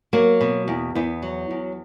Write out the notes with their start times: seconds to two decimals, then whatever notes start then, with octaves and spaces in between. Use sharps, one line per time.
0.13 F#3 A#3
0.41 B2
0.68 E2
0.95 E2 B3
1.22 F#3
1.51 E2